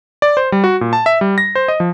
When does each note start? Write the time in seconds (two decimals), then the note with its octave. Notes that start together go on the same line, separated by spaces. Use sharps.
0.22 D5
0.37 C5
0.52 G3
0.64 F#4
0.81 A#2
0.93 A5
1.06 E5
1.21 G3
1.38 A#6
1.55 C5
1.68 D#5
1.80 F3